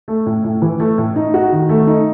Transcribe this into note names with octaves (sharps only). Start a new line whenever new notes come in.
A3
A2
A2
E3
A3
A2
D#4
F#4
D#3
A3
D#4